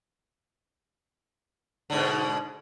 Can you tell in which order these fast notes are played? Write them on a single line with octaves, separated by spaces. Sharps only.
D3 G#2 B2